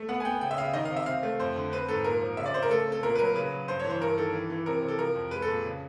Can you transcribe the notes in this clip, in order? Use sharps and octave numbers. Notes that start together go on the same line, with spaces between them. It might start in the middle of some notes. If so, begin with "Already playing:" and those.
Already playing: A3
B3 F#5
G#5
B3 G5
C#3 G5
E5
C#3 F5
D#3 D#5
C3 F5
E5
C4 F5
A3
F2 C5
D3
C4 B4
G#2 A4
A#2 A#4
F3
C#3 E5
D5
C#3 C5
A#4
A3 A4
C4
A4
A#2 A#4
B4
F#3 A#4
C#3 B4
F#3
G2 C5
C#5
E3 C5
G2 A#4
D#3 A4
E3
E3
C3 A#4
C3
A4
F3 A#4
F2
G#3 B4
A4
A#2
C#3